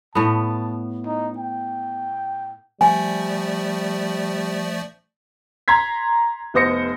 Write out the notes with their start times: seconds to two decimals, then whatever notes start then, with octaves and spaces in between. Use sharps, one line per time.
0.15 A2 B3 A5
1.06 D#4
1.38 G5
2.81 F3 G3 A3 D5 G#5
5.68 A#5 C6 G#6 B6
6.54 F1 B3 C5 D#6 A#6 C#7